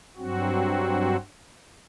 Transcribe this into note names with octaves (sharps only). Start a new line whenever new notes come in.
G2 F#3 C4 F#4